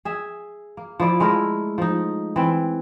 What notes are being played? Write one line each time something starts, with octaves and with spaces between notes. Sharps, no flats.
G#4 E5
A#3
F3 E4 D5
G#3 A3 E4 A#4
F3 D#4
E3 C4